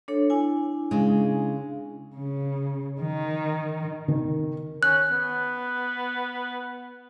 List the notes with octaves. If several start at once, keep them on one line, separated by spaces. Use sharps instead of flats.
D4 A4 C#5
D4 E4 G#5
C#3 G#3
C#3
D#3
D#3
C#4 F#6
B3